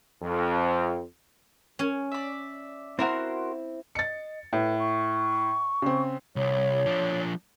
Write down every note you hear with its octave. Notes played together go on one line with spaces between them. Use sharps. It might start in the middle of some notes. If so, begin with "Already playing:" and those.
F2
C#4 C#5
D5 E5
C4 E4 F#4 A#4 C6
D#5 A6 C#7
A2 B4
C#6
C#3 C4
C2 C#5
F3 D4